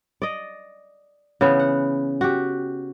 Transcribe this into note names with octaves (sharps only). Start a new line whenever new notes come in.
D5 D#5
C#3 E3 B3
F#5
F#4 G4